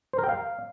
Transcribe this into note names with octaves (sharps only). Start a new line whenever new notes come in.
C5
A#4
G5
F5